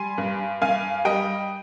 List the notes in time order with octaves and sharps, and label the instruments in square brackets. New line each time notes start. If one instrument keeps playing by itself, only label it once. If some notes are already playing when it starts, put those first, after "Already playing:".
Already playing: [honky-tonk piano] G3 G#5 C6
G2
G2 F5 G#5
G3 D#5 G5